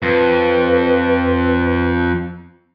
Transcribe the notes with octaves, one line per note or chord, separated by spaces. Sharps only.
F2 B4